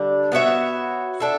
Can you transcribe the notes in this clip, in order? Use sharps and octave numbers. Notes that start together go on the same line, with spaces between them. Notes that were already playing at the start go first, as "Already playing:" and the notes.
Already playing: D3 G3 D4
B3 F#4 C#5 E5
D4 A4 E5